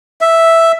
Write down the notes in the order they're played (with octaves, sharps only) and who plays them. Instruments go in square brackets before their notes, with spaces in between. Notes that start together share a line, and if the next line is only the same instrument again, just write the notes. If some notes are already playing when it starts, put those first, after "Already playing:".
[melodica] E5